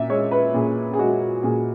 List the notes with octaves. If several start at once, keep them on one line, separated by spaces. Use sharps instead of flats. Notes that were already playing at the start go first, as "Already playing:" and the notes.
Already playing: A#2 E5
G#3 C#5
B4
A#2 G#4
G#4
G#3 F#4
A#2 G#4